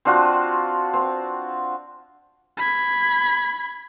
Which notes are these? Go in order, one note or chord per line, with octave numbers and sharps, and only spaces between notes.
C4 D4 F4 F#4
C4
B5 G#6